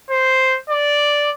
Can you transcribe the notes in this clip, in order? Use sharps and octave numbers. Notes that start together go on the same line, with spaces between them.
C5
D5